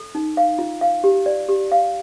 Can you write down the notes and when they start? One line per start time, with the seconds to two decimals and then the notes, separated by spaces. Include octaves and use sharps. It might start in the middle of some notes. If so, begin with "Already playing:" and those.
Already playing: A4
0.15 D#4
0.37 F5
0.59 F4
0.81 F5
1.04 G4
1.26 D5
1.49 G4
1.72 F5